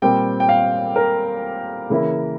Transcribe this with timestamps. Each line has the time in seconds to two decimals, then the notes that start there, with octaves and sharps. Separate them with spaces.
0.02 A#2 G3 C4 G5
0.40 G5
0.49 F5
0.96 A#4
1.90 C#3 E3 A#3 E4